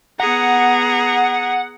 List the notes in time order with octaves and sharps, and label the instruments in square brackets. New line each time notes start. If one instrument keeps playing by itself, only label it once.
[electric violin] B3 A#5 [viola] G#4 [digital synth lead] F#5